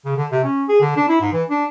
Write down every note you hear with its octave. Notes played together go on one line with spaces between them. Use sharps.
C#3
D3
C3
C#4
G#4
D3
D4
E4
G#2
E3
D4